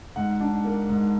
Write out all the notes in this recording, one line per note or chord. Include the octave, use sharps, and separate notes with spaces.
G#2 F#5
D4
A#3
G#2